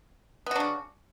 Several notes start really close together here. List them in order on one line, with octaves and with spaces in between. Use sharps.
B3 F#4 D4 C#3